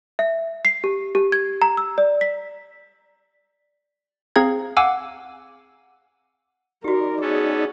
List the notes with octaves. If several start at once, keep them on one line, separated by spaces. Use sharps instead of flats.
E5
C7
G4
G4
G#6
A#5
E6
D5
B6
C4 G#4 F5 A#5 G#6
F5 F#5 G#5 D6 E6
D#4 F#4 G4 A#4 D5
B3 C#4 G#4 A4